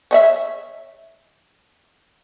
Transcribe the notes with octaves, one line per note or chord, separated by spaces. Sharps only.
C#5 D#5 E5